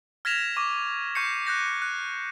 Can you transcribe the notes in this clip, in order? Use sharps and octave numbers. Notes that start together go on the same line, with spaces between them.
F6 G#6 A#6 B6 E7 F7
C#6 D6
C#6 G6 C7 C#7
F#6 G6 A#6
F#6